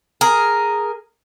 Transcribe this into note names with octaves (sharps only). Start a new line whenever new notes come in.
G#4 A#4